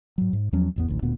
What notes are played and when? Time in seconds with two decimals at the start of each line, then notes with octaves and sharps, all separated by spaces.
0.18 G#2 F#3
0.33 G#2
0.52 E2 F3 F#3 C#4
0.76 A1 E2 B3
0.88 A1 D2
1.02 D1 D2 A#2 B3